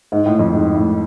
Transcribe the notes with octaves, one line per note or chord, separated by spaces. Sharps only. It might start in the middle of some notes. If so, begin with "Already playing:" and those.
G#2
A2
F2
G#2
A2